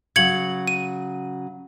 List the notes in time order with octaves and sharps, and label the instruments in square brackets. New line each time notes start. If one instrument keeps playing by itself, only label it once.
[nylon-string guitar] C#3 F#3 [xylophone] G#6 C#7 F#7
[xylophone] D#7